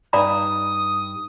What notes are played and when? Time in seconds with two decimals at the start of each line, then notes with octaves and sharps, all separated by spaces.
0.13 G2 D#4 D5 A#5 B5 D#6